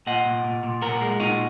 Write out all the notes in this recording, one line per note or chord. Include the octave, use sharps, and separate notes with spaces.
A#2 D#5 F#5
A#2
A#2
A#2
A#2 F#4 A#4
G#3
A#2 D#4 F#4